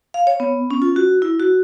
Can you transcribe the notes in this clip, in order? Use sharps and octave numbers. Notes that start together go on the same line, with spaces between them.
F5
C#5
B3
C#4
F4
F#4
E4
F#4